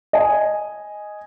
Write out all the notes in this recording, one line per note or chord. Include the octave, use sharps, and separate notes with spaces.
D#5 G#5